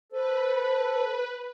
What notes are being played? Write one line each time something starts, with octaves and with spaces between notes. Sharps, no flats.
A4 B4 C5